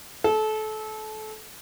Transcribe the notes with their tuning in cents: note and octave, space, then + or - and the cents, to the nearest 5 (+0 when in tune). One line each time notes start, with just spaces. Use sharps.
A4 -25